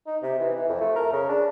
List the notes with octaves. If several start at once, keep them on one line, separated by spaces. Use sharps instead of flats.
D#4
C3
E3
E3
F2
A3
A#4
C#3
D4